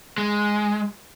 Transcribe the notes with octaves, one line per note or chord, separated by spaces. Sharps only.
G#3